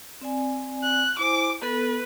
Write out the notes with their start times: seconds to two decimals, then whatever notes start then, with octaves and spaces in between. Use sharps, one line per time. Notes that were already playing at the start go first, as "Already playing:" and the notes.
0.21 C4 D5 G#5
0.83 F#6
1.19 E4 C5 G#5 D6
1.62 B3 A4 B4